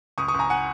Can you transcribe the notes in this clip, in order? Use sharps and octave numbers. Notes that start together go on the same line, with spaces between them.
C#2 C#6 D#6
C#6 D#6
C#2
G#5 A#5
F#5 G#5